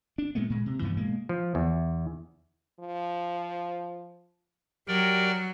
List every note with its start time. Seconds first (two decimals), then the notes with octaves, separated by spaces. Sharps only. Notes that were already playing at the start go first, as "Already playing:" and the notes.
0.18 D4
0.35 A#2 G#3 A3 B3
0.50 A#2 G#3
0.66 C3
0.82 G2 E3 F3 B3
0.97 B2 G#3 A#3
1.29 F3
1.55 E2
2.80 F3
4.88 F#3 G4 A#4 D5 G5